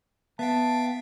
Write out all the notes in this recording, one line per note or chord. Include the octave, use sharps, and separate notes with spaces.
B3 E5 F5 G5 A5